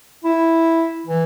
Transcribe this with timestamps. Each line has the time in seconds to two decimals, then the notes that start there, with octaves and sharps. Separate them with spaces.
0.24 E4
1.06 E3